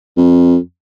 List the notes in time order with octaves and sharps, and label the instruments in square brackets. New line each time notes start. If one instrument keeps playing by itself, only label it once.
[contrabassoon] F2